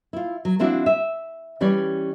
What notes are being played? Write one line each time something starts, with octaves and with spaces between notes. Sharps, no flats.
E4 F4
F#3
F3 C4 D4 E4 F#4
E5
E3 G3 C#4 C#5 D5